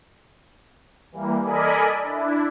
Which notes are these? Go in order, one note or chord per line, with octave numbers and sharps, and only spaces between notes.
E3 G3 A#3
A4 A#4 D5 D#5 G#5 B5
D4 E4